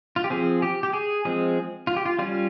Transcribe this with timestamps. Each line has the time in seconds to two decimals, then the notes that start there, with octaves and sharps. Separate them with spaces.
0.16 F4
0.24 G4
0.30 F3 C4 G#4
0.62 G4
0.83 G4
0.93 G#4
1.25 F3 G#3 C4 G#4
1.87 F4
1.96 G4
2.06 F4
2.19 G3 C#4 F4